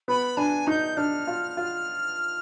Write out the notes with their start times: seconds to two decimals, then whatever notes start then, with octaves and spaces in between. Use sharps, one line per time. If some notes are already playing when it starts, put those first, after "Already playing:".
0.08 B3 B5
0.37 D4 G#5
0.67 D#4 G6
0.97 D4 F6
1.27 F4
1.57 F4